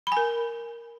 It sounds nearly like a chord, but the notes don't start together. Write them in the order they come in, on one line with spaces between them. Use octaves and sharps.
B5 G#5 A#4